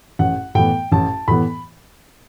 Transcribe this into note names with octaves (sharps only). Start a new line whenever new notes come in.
A1 F#5
A2 E3 B3 G5
A1 A5
A2 E3 B3 B5